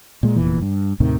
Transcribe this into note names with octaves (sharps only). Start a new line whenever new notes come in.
A#2 G#3
F1 E2 A#2 E3
G2
D#2 A2 C3 D#3